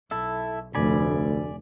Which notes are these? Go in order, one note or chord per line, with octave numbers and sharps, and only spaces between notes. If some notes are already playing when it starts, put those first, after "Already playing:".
B1 E4 A4 E5
F1 D2 D5 G#5 B5